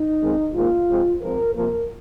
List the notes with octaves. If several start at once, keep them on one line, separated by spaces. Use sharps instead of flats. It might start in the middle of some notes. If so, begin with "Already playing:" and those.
Already playing: D#4
F2 D#3 G#3 C4
G#2 D#3 A#3 F4
C3 G#3 C4
G#2 F3 C4 A#4
C3 F3 A#3 A#4